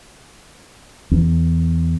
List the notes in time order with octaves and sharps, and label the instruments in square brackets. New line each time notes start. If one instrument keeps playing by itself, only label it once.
[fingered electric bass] E2